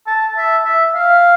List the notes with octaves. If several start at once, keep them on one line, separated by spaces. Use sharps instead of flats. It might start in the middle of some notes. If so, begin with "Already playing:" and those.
A5
E5
E5
F5